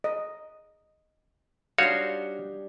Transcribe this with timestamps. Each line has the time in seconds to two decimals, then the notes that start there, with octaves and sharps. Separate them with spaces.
0.04 D#5
1.78 G3 D4 D#4 F#4 C#5 F5 G5